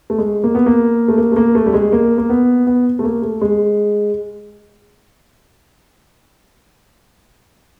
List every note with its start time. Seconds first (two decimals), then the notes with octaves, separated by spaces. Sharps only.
0.10 A3
0.18 G#3
0.44 A#3
0.55 B3
0.66 A#3
1.08 A3
1.18 A#3
1.32 A3
1.36 A#3
1.55 A3
1.66 G3
1.74 G#3
1.92 A#3
2.18 A#3
2.30 B3
2.67 B3
2.99 A3
3.04 A#3
3.23 A3
3.42 G#3